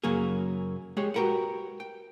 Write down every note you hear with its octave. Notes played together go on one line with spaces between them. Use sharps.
F#2 C#3 F#3 A#3 G#4
G#3 G4 G#4 C#5
F#4 G4 A#4 B4 F#5
G5